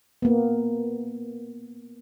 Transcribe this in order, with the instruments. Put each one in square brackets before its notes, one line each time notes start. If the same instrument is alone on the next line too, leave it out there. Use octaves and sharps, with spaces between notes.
[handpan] A#3 B3